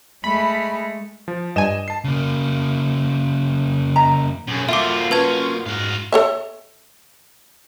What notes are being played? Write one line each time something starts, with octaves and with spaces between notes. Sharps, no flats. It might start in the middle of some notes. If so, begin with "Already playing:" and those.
G#3 A3 B5
F3
G2 D#5 G#5 E7
A5 C7
C#3 A#3
D#5 E5 A#5
B1 F#2 G#4
A#3 F4 F#4 A4 E5 G5 D6
C#4 B4 A5 G#6
G#2 F#4 F5
A4 C#5 E5